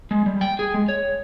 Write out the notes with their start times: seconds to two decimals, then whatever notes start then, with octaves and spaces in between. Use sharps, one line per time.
0.11 G#3
0.26 G3
0.41 G5
0.59 G#4
0.74 G#3
0.89 C#5